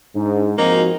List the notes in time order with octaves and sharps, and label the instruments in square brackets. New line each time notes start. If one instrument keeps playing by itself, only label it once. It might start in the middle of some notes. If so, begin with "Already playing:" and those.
[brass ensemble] G#2 [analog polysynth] D4 D#4
[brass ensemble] F3 G#3 C4 [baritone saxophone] A#3 [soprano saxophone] D#4 [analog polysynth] F#4